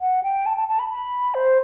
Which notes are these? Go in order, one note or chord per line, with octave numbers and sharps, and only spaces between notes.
F#5
G5
A5
A5
A5
B5
B5
C5